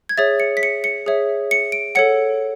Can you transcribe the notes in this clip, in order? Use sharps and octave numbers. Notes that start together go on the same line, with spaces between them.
G#6
G#4 C#5 E5 A6
C#7
B6
C#7
C#7
G#4 C#5 E5
C#7
D7
A4 C#5 F#5 C#7